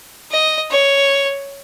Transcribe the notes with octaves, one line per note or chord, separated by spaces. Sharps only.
D#5
C#5